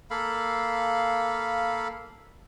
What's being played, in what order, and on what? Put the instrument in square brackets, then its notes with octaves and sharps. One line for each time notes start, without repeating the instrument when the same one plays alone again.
[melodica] A#3 A4 F5 B5